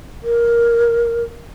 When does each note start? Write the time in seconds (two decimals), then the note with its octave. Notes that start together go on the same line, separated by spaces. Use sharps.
0.23 A#4